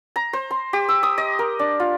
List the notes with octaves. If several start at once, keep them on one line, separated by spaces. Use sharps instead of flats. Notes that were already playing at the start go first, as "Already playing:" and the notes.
A#5
C5
C6
G4
E6
D#6
D#5
A#4
D4
F4